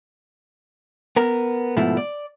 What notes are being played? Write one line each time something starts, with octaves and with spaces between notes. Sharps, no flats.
B3 A#4
G#2 B2 F3 A3 E4
D5